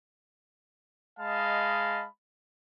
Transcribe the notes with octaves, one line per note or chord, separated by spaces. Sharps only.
G#3 D#5 F5 A5 B5